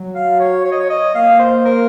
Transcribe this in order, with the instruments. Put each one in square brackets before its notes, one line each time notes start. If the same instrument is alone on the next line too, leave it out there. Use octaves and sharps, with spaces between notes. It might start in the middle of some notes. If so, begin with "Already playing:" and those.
Already playing: [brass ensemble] F#3
[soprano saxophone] F5
C#5
C#5
D#5
C#5
D#5
[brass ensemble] A#3 [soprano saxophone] F5
[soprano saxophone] C5
A#4